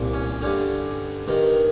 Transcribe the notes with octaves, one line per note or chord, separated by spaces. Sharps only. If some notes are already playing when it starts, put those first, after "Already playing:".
Already playing: C2 A#2
C#4
G2 D3 C#4
G2 D#3